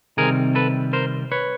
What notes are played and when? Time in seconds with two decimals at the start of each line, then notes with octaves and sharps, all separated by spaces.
0.17 C3 D#3 G3 C4 G#4 A#4
0.55 A4 B4
0.93 A#4 C5
1.32 B4 C#5